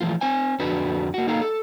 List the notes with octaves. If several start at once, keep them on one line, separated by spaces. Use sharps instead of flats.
E3 F3 A3 F4
C4 C5 G#5
F2 D3 D4 F#4 B4
A#3 F#4
A#3 D#4 A4 F5
A4